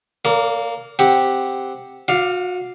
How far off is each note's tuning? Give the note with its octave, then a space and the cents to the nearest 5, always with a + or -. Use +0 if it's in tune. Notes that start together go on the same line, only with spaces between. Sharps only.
A#3 +0 A4 +45 D5 -45
C4 +0 G4 +0 F#5 +0
F#4 -35 D5 +0 F5 +0